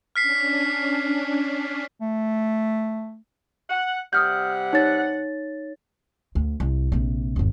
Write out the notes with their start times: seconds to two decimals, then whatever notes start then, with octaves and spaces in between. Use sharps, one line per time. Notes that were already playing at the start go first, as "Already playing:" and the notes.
0.16 C#4 D4 F6 B6 C7
2.01 A3
3.69 F#5
4.13 C3 G3 F#5 D#6 F6 G6
4.73 D#4 C#5 A6
6.35 D2
6.60 C2
6.92 A#1 C3
7.36 G1 D#2